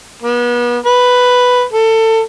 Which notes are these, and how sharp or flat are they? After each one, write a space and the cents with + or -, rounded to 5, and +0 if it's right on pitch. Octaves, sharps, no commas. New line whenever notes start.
B3 -35
B4 +5
A4 +25